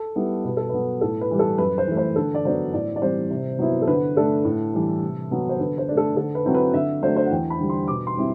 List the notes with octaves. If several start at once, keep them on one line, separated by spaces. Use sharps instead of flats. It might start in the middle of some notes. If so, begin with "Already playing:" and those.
Already playing: A4
G3 B3 E4
B2 B4
A4
F#3 B3 B4
A2 A4
B4
E3 G3
A4
F#2 B4
C5
E3 A3
C5
D3 A4
D5
F#3 B3 D4 C5
A2 D5
D5
E3 G3 C4 C5
C3
F#3 B3 E4
A4
D3 B4
A3 D4 A4
A2
E3 G3
C3
F#3 B3
C5
D3 B4
C5
A3 D4
A4
D3 A4
B4
F#3 C4 E4
B4
D3 E5
F#3 A3 D4 C5
C5
F#5
E2 G5
B5
D3 G3
C6
B2 D6
C6
G3 C4 E4